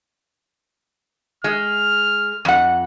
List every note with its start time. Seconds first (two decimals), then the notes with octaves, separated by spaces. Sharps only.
1.44 G#3 F6
2.45 F2 F#5